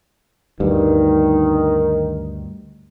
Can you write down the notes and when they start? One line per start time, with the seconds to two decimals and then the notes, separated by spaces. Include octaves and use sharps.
0.60 D2 G2 D#3